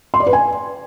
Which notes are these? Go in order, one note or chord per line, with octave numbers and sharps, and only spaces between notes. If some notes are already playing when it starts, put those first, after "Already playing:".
C6
D5
B4
G#5